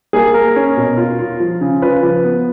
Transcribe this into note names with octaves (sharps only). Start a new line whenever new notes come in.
A#3 G#4
A#3 A#4
C#4
B2
F4
F4
F3
C#3
F4 B4
F3
B3